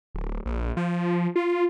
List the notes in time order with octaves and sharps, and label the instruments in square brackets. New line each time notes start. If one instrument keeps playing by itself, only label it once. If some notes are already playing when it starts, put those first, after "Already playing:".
[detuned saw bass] D1
A#1
F3
F4